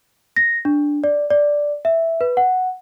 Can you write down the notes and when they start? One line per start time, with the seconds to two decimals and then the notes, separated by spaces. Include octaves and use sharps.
0.36 A#6
0.65 D4
1.04 D5
1.30 D5
1.85 E5
2.21 B4
2.37 F#5